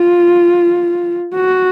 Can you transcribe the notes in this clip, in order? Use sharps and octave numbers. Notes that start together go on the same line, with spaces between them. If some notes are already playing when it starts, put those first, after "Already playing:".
Already playing: F4
F#4